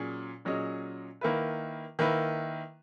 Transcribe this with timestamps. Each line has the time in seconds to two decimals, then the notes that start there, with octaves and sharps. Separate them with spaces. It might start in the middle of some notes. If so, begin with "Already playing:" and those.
Already playing: A#2 F#3 C#4 G#4
0.45 A#2 F#3 C#4 G#4 D#5
1.21 D#3 A#3 E4 B4
1.99 D#3 A#3 E4 B4